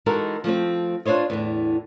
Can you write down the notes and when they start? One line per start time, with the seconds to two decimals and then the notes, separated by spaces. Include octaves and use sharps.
0.06 E3 G#3 D#4 F#4 A4 A#4
0.44 F3 A3 A#3 C4
1.06 D4 F4 C5 C#5 D#5
1.30 E2 A2 D3